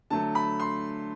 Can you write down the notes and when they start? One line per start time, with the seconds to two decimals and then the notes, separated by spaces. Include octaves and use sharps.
0.10 D3 F#3 A3 A5
0.35 B5
0.60 C6